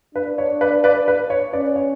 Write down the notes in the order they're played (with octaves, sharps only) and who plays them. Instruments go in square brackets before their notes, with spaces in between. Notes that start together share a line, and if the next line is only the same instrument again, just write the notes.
[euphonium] D4 [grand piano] B4
[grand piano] C#5
B4 D5
B4 D5
B4
C#5
[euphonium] C#4 [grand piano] B4 D5
[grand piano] C#5